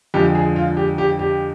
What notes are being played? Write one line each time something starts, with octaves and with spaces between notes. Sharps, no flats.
F2 D3 F3 G#3 G4
G#4
F4
G4
G4
G4